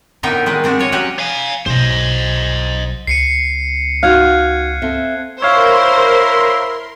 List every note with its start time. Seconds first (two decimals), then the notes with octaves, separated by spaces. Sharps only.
0.23 A2 D3 B3 D#4 A#4 G5
0.46 D#3 G#3 B4
0.64 G#3 C4 D4 F#4
0.79 F4 C#5 D#5
0.92 F#3 C#4 F#4 G4 F5 F#5
1.19 F5 G#5
1.66 B1 C5 D#5
3.07 C#2 C7 C#7 D#7
4.03 D#4 F#4 F5 F#6 G#6
4.82 C4 A4 E5
5.42 E4 A#4 C5 C#5 F5 C6